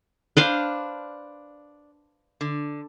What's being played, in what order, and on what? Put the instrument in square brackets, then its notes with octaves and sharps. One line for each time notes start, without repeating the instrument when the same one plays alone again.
[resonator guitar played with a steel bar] D4 [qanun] B4 C5 F5
[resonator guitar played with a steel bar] D3